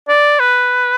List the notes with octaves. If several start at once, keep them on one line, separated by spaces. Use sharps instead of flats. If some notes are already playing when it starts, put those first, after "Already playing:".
D5
B4